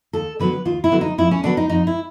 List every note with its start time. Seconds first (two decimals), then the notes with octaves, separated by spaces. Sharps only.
0.13 D#2 A4
0.40 D3 F#3 B3 B4
0.65 D#2 F4
0.84 E4
0.92 D3 F#3 B3
1.01 D#4
1.18 F2 E4
1.31 C#4
1.43 D3 F#3 B3 D4
1.57 D#4
1.69 F2 D#4
1.87 E4